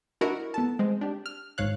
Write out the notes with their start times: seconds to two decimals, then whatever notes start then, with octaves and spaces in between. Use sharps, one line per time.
0.21 D4 E4 F#4 A#4 D#5 F#5
0.54 B3 A4 A5
0.79 G#3 C4
1.01 D4 G4
1.26 F6
1.58 G#1 C#5 F5 F#6